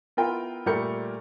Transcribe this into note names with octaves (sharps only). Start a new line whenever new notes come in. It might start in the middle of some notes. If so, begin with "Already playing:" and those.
B3 E4 F4 A#4 G5
A#2 G3 A3 A#4 G6 C#7